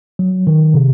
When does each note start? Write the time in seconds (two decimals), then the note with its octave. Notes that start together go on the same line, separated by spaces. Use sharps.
0.19 F#3
0.47 D#3
0.74 C3